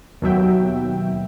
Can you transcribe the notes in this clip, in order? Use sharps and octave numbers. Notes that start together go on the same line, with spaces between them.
D#2 B2 F#3 E5 G5